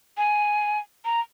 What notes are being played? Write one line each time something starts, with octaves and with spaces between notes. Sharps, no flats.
G#5
A#5